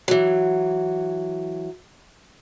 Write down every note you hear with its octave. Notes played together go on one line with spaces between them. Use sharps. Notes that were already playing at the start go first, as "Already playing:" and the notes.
E3 F#3